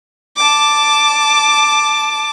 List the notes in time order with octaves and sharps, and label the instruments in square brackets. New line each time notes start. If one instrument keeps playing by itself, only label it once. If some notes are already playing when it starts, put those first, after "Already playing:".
[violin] A5 D6